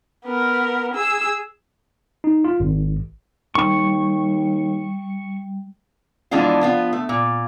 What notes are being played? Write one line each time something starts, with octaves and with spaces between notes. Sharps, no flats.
B3 A#4
G#4 E6
D#4
F4
G#1
D#2 G3 C#6
E3 F3 G#3 B3 D4 F4
F3 B3 F4
A3
A#2